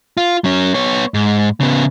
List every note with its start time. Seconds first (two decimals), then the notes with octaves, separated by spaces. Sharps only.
0.17 F4
0.44 F#3 C#4
0.74 B3 C#5
1.14 G#2
1.60 C#3 B3